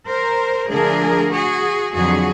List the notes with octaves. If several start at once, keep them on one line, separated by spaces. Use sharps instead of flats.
A#4 C5
D3 F3 A3 D4 G#4 A#4
F#4 G#4
F2 D3 F#3 F#4 G#4